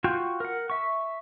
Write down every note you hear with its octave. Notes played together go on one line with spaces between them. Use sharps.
F4 F#4 G5 C#6
A#4 F#5
E5 C#6